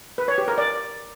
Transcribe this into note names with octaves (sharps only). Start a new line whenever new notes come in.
B4
C#5
G4
A#4
D5